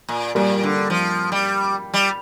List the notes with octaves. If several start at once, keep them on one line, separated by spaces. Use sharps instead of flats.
A#2
A#2 G3 A#3
D3
F3
G3
G3